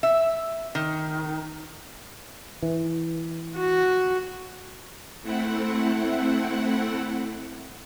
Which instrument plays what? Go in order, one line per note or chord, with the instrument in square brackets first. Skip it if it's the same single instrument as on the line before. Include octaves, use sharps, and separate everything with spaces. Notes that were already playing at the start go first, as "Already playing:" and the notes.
[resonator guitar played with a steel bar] E5
D#3
[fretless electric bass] E3
[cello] F#4
[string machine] A3 C4 E4 F#5